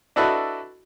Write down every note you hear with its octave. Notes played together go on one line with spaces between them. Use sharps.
D4 E4 F#4 A4 B4 D#5